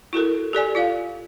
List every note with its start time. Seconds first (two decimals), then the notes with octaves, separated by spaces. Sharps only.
0.13 E4 F#4 A4 A#4
0.53 G4 A4 D5 G#5
0.75 F4 D5 F5